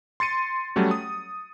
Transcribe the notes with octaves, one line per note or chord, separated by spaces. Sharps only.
C6 A6 C#7 D#7
F#3 G3 A3 C#4
D#6